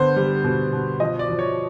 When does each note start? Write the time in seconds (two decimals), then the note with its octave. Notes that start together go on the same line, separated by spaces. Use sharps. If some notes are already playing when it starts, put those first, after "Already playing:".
Already playing: D3 B3 C5
0.16 G3
0.44 B2
0.73 B2
1.00 F3 D#5
1.19 D5
1.29 F3
1.39 C#5